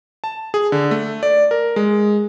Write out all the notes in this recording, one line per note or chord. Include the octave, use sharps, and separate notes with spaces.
A5
G#4
D3
A3
D5
A#4
G#3